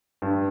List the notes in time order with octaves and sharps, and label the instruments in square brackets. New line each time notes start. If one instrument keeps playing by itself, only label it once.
[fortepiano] G2